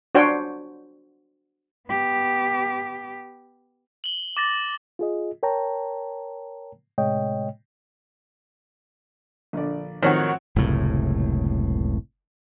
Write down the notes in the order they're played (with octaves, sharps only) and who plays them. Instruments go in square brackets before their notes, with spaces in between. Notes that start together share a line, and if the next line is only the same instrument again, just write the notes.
[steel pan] D4 F#4 C5 C#5 G5
[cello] B3 G4
[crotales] F#7 G7
D6 A6 A#6
[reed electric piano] F4 G#4 D#5
A#4 C#5 G5 A5 A#5
A2 C3 G#3 C#5 D#5 G5
[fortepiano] A#1 D3 D5
[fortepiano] A2 F3 F#3 [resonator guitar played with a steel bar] D#3 [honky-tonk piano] C4 C#5 F#5
[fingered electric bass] F#1 C#2 A2 C3